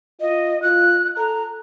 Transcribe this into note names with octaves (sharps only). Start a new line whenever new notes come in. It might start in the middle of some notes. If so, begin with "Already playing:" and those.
F4 D#5
F4 F#6
A4 A#5